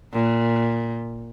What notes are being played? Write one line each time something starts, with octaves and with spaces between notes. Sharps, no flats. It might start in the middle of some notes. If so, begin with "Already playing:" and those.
A#2